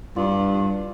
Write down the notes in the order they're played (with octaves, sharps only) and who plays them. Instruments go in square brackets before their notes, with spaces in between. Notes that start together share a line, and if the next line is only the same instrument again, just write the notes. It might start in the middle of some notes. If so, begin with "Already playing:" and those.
[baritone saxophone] G2 [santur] F4